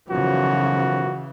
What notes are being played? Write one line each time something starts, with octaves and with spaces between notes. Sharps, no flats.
B1 F#2 C#3 E3 F3 F#4